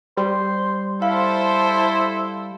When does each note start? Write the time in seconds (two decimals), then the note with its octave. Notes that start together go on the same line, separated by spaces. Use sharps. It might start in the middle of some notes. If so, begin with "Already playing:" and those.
0.17 G3 C5
1.02 E4 A4 C5 F5